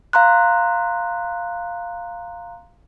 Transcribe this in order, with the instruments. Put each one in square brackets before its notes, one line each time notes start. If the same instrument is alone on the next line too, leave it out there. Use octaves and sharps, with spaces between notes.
[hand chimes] F5 A#5 C6 F#6